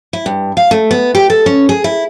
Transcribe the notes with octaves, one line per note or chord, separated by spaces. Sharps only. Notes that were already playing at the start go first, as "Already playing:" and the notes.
E4
G2
F5
A3
B3
G4
A4
C#4
G#4
E4